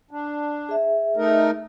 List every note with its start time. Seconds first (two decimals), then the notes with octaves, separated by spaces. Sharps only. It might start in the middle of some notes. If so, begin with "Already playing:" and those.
0.11 D4
0.69 G#4 E5
1.17 A3 D#4 A#4